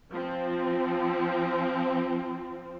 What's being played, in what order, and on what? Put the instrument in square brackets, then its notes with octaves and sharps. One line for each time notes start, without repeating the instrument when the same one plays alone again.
[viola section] F3 C4